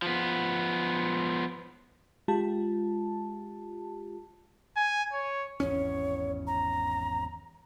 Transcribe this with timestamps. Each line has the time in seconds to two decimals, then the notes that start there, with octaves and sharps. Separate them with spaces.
0.02 F3 B3
2.28 G#3 F4 G4 A5
4.77 G#5
5.13 C#5
5.60 G#1 E2 C#4 C#5
6.47 A#5